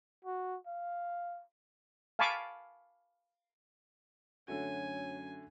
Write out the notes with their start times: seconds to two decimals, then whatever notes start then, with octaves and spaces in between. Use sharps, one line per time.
0.25 F#4
0.67 F5
2.19 F5 G#5 A5 B5 C#6 D6
4.48 F#2 D3 A3 F#4 C#5 G#5